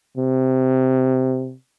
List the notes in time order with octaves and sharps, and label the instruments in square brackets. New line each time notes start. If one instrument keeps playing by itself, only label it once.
[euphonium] C3